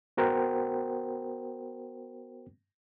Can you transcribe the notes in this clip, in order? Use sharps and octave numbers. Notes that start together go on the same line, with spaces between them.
B3 F#4 A#4 C5 F#5 G5